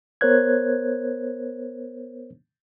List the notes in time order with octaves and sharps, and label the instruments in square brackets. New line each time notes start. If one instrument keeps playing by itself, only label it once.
[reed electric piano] B3 A#4 C5 C#5 F#6 G#6